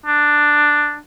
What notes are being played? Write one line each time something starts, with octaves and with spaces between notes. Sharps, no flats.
D4